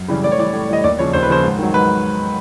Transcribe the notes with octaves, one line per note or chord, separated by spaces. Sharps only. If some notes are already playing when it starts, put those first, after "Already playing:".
Already playing: F#2
C#3 E3 G3
A2 D5
C#5
E3 G3 D5
A2
E3 G3 D#5
D#2 D5
C#3 F3 C#5
D#2 C5
B4
C#3 F3 C5
G#2
D#3 F#3
G#2 B4